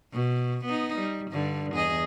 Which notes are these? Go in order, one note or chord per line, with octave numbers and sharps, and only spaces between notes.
B2
B3 D#4
G3
G2 D3
E2 G#4 D#5